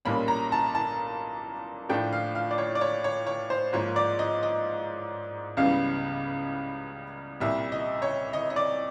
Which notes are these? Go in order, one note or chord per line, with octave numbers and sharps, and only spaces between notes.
B1 A#2 G3 A#3 C#4 B5
A#5
A5
A5
A2 F3 A3 D4 F4 G5
F5
F5
D5
C#5
D5
C#5
C#5
C#5
C5
G#2 F3 A#3 C#5
D5
D#5
D#5
C#2 C#3 E3 G3 B3 F5
C2 A#2 G3 E5
D#5
C#5
D#5
D#5
D5